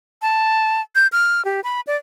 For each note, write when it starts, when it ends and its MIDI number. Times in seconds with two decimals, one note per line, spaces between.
0.22 0.81 81
0.95 1.07 91
1.12 1.44 89
1.45 1.61 67
1.64 1.81 83
1.87 1.97 74